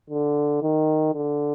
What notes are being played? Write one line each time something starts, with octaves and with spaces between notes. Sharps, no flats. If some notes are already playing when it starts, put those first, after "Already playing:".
D3
D#3
D3